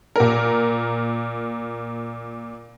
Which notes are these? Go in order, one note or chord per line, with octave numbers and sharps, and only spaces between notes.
A#2 A#4